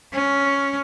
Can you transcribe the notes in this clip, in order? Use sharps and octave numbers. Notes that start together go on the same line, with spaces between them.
C#4